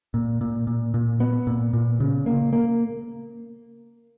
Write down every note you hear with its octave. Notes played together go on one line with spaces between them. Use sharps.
A#2
A#2
A#2
A#2
B3
A#2
A#2
C#3
A#3
A#3